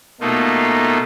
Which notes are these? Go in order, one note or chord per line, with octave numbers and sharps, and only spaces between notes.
B2 A3 A#3 D#4 F4